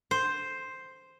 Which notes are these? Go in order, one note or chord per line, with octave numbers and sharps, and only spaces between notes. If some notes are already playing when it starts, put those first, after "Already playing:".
C5